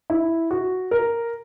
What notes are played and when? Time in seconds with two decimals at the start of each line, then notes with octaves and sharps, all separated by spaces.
0.10 E4
0.51 F#4
0.91 A#4